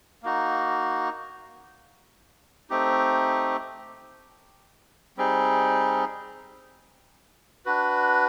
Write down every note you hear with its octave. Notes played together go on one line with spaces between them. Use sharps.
A#3 D#4 F#4
A3 C4 D#4 G4
G3 C4 D#4 G#4
D4 F#4 B4